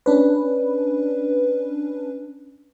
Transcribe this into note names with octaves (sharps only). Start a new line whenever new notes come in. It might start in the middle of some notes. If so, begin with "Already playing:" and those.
C#4 D4 B4